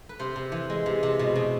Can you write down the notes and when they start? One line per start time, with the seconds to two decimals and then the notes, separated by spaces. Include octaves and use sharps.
0.09 B4
0.19 C3 C5
0.36 C3
0.52 E3
0.70 G#3
0.86 C3
1.03 C3
1.19 B2
1.36 B2